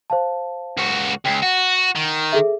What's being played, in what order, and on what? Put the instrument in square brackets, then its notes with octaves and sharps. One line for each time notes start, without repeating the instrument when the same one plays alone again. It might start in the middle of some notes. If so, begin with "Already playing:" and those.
[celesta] C5 F5 A5
[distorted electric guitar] C#2 F#4
[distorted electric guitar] C#2 [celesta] G5 B6 C7
[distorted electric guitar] F#4 [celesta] F#5 C#7
[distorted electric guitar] D#3
[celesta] G#4 A4 E5